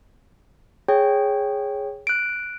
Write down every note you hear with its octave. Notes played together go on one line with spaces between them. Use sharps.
G#4 C#5 G5
F#6 D7